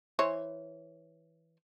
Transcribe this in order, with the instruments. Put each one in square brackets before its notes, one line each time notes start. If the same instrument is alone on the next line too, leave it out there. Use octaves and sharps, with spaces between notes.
[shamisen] E3 C5 C#5